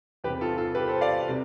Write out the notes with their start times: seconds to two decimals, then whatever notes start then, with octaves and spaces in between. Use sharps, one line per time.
0.24 E2 C3 G3 G4 B4
0.41 F4 A4
0.58 F4 A4
0.75 G4 B4
0.88 A4 C5
1.01 D5 F5
1.28 C3 G3